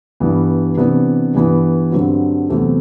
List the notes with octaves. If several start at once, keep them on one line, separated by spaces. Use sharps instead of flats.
G2 E3 B3
C3 E3 B3 D4
G2 E3 B3
G2 D3 F#3 C4
E2 C3 F#3 A3 C4